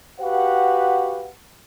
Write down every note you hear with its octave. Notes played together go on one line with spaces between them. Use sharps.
F#4 G4 B4 F5 F#5